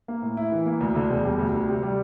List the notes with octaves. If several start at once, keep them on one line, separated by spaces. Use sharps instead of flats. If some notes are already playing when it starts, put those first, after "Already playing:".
A#3
A2
E4
E3
A#3
D2
D3
E1
G3
D2
D3
C3
G3